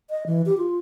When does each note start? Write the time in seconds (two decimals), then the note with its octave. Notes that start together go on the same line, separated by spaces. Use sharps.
0.10 D#5
0.27 E3
0.46 G4
0.58 F4